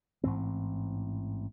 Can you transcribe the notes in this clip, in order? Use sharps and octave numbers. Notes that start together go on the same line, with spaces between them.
A1 G#2 E3 C4